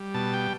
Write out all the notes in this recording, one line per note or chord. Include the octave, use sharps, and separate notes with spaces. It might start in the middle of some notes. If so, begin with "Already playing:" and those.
Already playing: G3
B2 A5
G5